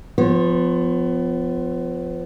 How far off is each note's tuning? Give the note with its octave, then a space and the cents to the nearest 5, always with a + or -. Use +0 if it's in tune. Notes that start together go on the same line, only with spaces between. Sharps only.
F3 +0 B3 +25 C#5 -30